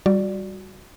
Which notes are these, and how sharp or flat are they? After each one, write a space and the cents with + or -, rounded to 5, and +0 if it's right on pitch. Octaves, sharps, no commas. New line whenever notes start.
G3 +0 F#4 -10 D5 +0